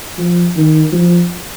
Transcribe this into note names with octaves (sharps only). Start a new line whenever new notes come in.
F3
D#3
F3